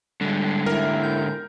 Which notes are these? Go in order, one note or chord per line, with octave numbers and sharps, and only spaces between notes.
G#2 D3 G3
E4 A#4
G6